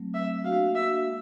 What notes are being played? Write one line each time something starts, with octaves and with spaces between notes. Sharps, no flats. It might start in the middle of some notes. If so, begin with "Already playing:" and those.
Already playing: F#3 A3 C4
E5
A#3 D4 F#4 F5
E5
G#3